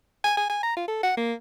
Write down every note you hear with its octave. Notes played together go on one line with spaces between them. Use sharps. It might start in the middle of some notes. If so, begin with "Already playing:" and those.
G#5
G#5
G#5
A#5
F4
A4
F#5
A#3